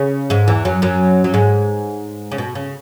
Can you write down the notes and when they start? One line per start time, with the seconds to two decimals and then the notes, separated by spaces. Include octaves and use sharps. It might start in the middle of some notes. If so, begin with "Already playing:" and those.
Already playing: C#3
0.30 G#2 G#3
0.48 E2 E3
0.65 F#2 F#3
0.82 F#2 F#3
1.24 F#3
1.34 G#2 G#3
2.32 C#3
2.38 B2
2.55 C#3